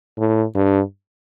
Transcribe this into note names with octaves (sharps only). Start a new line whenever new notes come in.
A2
G2